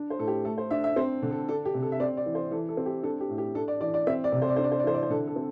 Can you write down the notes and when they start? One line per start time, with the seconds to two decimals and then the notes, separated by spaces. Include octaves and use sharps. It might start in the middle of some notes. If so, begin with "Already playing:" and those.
Already playing: D4
0.10 C5
0.19 A2 A4
0.28 G4
0.45 A3 A4
0.58 C5
0.71 D4 E5
0.84 E5
0.96 C4 C5
1.22 D3
1.31 A4
1.49 D4 A4
1.65 G4
1.74 C3
1.82 A4
1.92 E5
2.00 C4 D5
2.17 D5
2.26 E3
2.35 C5
2.51 E3 A4
2.69 A4
2.77 C4
2.86 G4
3.03 D4 A4
3.20 G4
3.29 A2
3.38 G4
3.55 D4 A4
3.68 D5
3.81 E3 D5
3.94 D5
4.07 C4 E5
4.24 D5
4.32 C3
4.42 C5
4.49 D5
4.56 D4 C5
4.64 D5
4.71 C5
4.79 D5
4.84 E3 C5
4.94 D5
5.02 C5
5.10 D3 A4
5.27 A4
5.36 C4